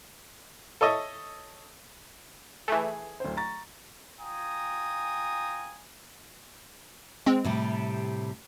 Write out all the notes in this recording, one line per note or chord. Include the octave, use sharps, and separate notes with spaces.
A4 C#5 D#5 E5
E3 A3 G#4
D1 C5
A#5 C#6 A6
F4 G5 G#5 A#5 D#6
G#3 C4
A2 C3 G3